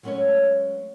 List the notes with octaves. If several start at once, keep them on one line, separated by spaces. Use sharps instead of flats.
F#3 G#3 A3 C#4 B4 C#5